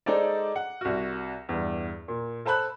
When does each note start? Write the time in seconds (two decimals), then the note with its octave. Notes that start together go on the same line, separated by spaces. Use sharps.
0.06 G#3 D#4 G#4 A4 C5 D5
0.56 F#5
0.81 C2 F#4
1.49 E2 G2
2.08 A#2
2.45 A4 C5 A5 B5 F#6